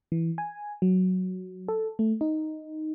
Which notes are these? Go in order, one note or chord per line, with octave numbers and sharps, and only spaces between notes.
E3
G#5
F#3
A4
A3
D#4